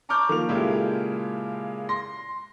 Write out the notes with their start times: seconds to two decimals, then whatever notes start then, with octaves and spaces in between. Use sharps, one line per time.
0.09 A5 A#5 C#6 D6 F6 G6
0.29 D#3 F3 A#3 D6 F7
0.48 A#2 C#3 G#3 E4 G4 A4
1.89 C6 A#6